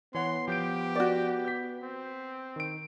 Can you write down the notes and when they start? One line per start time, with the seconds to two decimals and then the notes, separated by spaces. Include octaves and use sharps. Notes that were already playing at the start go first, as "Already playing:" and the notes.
0.14 E3 B3 C#5 F#5 C6
0.48 F3 G4 G6 D7
0.95 F#4 D5
1.45 G6 B6
1.83 C4
2.56 D#3 D7